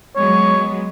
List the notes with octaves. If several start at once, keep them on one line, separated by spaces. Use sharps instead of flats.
F#3 G#3 B3 C#5